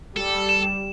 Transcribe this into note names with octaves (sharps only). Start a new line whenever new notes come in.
G3 A4
E7